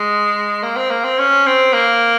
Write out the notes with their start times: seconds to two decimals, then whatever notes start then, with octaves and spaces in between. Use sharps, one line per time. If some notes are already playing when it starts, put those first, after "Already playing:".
Already playing: G#3
0.63 A#3
0.76 C4
0.91 A#3
1.05 C4
1.18 C#4
1.46 C4
1.73 A#3